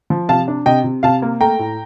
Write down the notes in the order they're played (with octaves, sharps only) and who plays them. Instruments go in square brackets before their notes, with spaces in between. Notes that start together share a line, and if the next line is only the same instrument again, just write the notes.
[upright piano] F3
C3 F5 A5
D4
C3 D#5 G5
C3
C3 F5 A5
A#3
A3 G5 A#5
A2